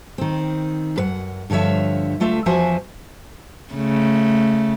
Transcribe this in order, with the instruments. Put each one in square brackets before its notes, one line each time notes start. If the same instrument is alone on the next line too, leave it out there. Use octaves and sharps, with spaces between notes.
[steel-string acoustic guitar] D#3 C4
F#2 B4 F#5
G2 D3 F3 C#5 E5
D2 A3 F4 E5
E2 F3 F#4 C5 E5 G#5
[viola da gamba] C#3 A3